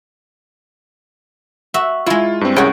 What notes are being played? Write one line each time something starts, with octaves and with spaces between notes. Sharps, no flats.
F#4 E5
G#3 E4 F4
G2 C4
C2 C#4 F#4 G#4 G5